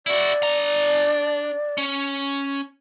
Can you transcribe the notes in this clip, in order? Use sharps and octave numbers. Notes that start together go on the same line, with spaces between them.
E4 F#4 D5
D4 A#5
C#4